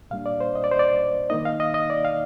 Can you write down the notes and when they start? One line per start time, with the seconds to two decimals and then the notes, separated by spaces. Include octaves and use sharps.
0.11 A#2 G3 A#3 D4 F5
0.26 D5
0.40 C5
0.55 D#5
0.64 D5
0.71 C5
0.79 D5
1.30 D#3 A#3 D#4 D#5
1.45 F5
1.60 D#5
1.74 D#5
1.90 D5
2.05 F5